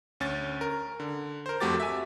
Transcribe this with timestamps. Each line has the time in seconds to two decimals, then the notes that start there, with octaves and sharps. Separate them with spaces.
0.20 D2 C#4 A6
0.61 A#4
1.00 D3
1.46 A#4 C5
1.60 F2 A3 F#4 G4 D6 A6
1.80 E5 G#5